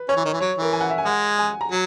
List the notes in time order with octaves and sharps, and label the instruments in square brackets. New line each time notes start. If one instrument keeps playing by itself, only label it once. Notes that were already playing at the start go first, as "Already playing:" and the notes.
Already playing: [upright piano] B4
[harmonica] C#4 [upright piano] C#5
[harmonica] E3
D#3
E3
[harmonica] F#3 [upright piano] C#5
[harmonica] E3 [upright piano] A#4
[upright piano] G#5
F#5
E5
G#5
[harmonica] G#3 [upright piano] F#5
[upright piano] G#5
A#5
[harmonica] F#3